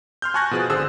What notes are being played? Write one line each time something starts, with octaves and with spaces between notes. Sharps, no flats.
C6 F6 G6
G#5 A5 C#6 F#6 G#6 A#6
B2 F3 G#4 F#6 A6
G#1 D3 G#4 C5 E6